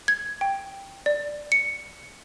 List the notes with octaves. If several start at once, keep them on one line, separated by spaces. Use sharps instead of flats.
G#6
G5
D5
C#7